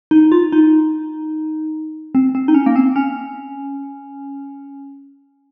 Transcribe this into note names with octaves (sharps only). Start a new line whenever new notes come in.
D#4
F4
D#4
C4
C4
D#4
C#4
A#3
C4
C#4